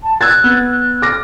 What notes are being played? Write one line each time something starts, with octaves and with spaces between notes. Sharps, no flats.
A5
E6 F#6 G#6 A6
B3
F#6
D6 F6 A#6